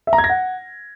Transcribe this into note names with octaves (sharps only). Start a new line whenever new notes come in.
E5
A#5
G#6
A#6
F#5